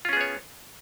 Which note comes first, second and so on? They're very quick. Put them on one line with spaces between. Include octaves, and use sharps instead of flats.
F4 C#4 G#4 B3 C#5